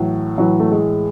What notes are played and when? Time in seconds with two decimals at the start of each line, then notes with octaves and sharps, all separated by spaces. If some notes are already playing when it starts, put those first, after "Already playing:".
Already playing: A2 E3 F#3
0.38 A2 E3 F#3
0.60 A3
0.71 G#3